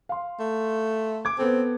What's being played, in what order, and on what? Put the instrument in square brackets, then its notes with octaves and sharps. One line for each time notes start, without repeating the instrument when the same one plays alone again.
[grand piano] F5 C6
[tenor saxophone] A3
[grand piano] D6 G#6
[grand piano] B3 A4 [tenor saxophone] C4